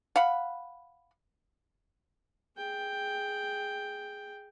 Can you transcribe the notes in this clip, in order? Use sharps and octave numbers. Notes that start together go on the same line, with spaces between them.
F5 F#5 B5
G#4 G5